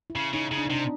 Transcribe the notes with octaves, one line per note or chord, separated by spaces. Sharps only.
E4
C#3
C#3 D#4
C#3
D4
D#4
C3 D4